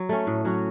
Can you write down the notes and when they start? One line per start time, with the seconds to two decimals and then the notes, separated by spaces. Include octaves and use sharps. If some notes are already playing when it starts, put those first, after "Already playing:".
Already playing: F#3
0.09 A3 C#4
0.27 A2
0.45 F#3 C#4 F#4